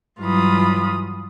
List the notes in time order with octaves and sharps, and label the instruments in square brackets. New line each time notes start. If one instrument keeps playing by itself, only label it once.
[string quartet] G2 E3 F#3 F4 B5 D#6